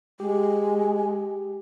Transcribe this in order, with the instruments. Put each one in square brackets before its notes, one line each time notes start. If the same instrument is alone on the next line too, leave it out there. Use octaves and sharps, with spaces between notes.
[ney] G#3 [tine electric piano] G4